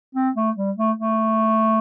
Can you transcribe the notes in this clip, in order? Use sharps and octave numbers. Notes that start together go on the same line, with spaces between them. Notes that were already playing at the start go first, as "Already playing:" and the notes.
C4
A3
G3
A3
A3